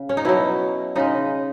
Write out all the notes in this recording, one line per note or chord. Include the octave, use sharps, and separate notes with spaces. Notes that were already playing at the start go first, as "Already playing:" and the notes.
Already playing: C#3
C#4
D#4
B2 F#3 E4
C#3 G#3 D#4